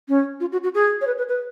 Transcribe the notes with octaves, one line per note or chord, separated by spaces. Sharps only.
C#4
F4
F#4
F#4
G#4
C#5
B4
B4
B4